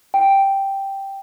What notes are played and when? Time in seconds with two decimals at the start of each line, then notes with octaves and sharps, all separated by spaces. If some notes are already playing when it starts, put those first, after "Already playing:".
0.14 G5